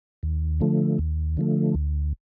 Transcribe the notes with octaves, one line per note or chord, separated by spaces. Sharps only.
D#2
D3 F3 A3
D#2
D3 F3 A3
D2